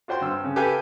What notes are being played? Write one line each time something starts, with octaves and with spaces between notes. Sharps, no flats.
F4 F#4 C5 G5 C6
G2 E6
C#3
G4 A4 B4 F5 G5 G#5